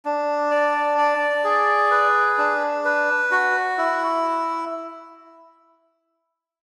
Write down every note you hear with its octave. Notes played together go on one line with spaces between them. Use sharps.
D4
D5
D5
G#4
B4
D4
B4
F#4
E4